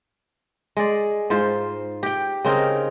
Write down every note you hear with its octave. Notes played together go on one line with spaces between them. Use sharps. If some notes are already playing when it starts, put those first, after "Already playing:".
G#3 D5
G#2 F4 C5
G4 G5
C#3 C4 D#4 A#4